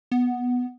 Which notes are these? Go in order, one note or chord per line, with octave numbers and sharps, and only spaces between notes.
B3